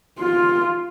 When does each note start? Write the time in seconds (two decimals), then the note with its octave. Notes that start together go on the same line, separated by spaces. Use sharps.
0.19 F4